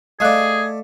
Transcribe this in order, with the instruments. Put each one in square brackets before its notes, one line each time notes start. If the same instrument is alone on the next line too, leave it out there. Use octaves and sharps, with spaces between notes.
[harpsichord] A3 D5 [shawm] G#4 [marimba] D#5 F5 F#6